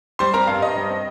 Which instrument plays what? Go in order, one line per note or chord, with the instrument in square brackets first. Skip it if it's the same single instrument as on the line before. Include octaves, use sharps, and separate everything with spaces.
[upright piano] G3 C5 C6
C4 A#4 A#5
G2 F5
G2 D#5
G3
C4